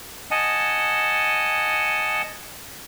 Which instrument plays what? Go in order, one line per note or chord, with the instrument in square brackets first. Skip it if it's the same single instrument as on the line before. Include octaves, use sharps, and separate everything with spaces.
[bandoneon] D#5 F#5 G#5 A5